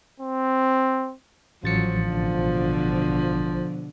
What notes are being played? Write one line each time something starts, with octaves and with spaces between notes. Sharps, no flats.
C4
A1 F3 F#3 A6 C#7
B2 D3